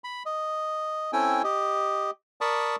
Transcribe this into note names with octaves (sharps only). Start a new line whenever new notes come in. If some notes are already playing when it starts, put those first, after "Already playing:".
B5
D#5
C4 C#4 E4 A4 G5 G#5
G4 D#5
A#4 D5 A5 B5 C#6 D#6